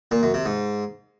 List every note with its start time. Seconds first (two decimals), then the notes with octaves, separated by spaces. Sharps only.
0.11 A#2
0.23 F#2
0.34 C3
0.45 G#2